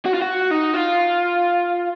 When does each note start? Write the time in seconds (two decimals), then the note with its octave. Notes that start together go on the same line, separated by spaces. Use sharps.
0.06 F#4
0.14 F4
0.22 F#4
0.51 D#4
0.74 F4